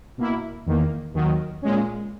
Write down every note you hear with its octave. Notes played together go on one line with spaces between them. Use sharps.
B2 A#3 E4
E2 D#3 A#3
D#2 D#3 F#3
A#2 G#3 C#4